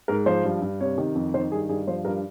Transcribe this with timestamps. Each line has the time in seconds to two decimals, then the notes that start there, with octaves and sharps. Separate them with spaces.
0.08 G#2 A#4
0.26 F3 C5
0.44 G2
0.62 G2
0.81 C3 C#5
0.98 D#3
1.15 F2
1.34 D#3 C5
1.52 G2 G#4
1.69 G2 G#4
1.87 F3 C5
2.05 G2 A#4